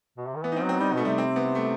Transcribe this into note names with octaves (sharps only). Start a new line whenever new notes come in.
B2
C3
D#3
E3 B3
D#4
C4
F#3
C4
G3 D#4
B2 A3
C3 G3
C4
B3
A3